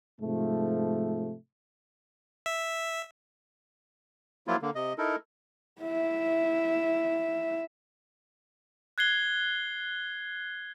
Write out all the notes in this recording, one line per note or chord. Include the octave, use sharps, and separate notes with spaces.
G#2 C3 F3 A3
E5
F3 F#3 A#3 E4 F4
D3 A#3
C3 D#5
D#4 E4 A4 A#4
E4 E5
F#6 G#6 C7 G7